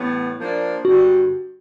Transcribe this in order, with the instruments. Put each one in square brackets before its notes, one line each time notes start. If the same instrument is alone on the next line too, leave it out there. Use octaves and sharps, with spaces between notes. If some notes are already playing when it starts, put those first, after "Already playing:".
Already playing: [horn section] A2 E3 G3 B3
F3 A#3 D4
[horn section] G2 D3 G3 [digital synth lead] F#4